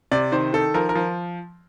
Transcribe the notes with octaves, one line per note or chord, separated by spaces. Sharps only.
C3 D5
D#3 C5
D#3 A4
F3 A#4
A#4
F3